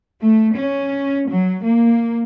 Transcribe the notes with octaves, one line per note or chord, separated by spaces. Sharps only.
A3
C#4
F#3
A#3